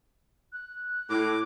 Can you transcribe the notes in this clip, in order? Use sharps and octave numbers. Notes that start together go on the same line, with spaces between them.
F#6
A2 D6